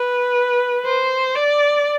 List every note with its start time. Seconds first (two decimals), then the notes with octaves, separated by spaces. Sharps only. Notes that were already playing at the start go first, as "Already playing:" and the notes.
Already playing: B4
0.85 C5
1.35 D5